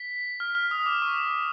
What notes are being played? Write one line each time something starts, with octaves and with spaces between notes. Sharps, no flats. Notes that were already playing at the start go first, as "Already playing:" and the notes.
Already playing: B6
F6
F6
D#6
D6
C#6
D6